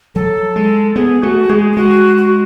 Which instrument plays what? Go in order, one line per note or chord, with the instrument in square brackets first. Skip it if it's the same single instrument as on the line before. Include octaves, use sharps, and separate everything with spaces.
[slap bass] F#3 [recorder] A4
[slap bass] G#3
[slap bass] B3 [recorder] G#4
[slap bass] A3 [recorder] F#4
[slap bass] G#3 [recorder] G#4
[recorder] G#4
[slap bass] G#3 [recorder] F#4
[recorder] F#4